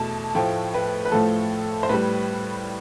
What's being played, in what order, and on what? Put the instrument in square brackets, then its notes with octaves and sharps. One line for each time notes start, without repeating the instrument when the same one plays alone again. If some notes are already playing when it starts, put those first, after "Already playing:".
Already playing: [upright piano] E2 B2 A3 A5
A2 F3 A3 G5
B4
B4
A2 F3 A3 A4
C5
A2 G3 B4